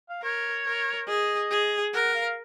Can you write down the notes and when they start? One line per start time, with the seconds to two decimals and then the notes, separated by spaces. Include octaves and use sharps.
0.09 F5
0.22 A#4 C#5
0.66 A#4
1.08 G#4 D#5
1.50 G#4
1.94 A#4 F#5
2.14 F5